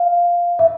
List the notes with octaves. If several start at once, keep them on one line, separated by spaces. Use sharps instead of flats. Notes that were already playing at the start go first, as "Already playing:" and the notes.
Already playing: F5
E5